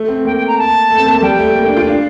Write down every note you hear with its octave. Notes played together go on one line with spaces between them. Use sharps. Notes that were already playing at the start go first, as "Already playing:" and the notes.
Already playing: A3
C4
A#3 G5
G5
A#5
A5
A3
C4
A#3
A3
G3 G5
A3
A#3
D4
F4
D4 F5